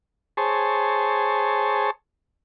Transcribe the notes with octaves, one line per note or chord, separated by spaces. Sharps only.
G#4 C5 C#5 A5